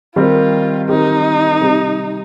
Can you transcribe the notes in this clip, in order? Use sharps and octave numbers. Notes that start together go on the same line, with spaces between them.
D#3 G3 C4 F4 G4 A#4
D#3 G3 C4 D#4 G4 A#4
C3 G3 C4 G4